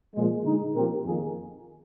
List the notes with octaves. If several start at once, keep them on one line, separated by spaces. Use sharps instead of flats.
A#2 F3 G#3
D3 G#3 D#4
A#2 F3 C4 G4 A#4
F2 D#3 A#3 D#4 G#4